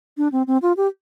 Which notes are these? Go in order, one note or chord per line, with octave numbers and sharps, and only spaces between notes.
D4
C4
C4
F4
G4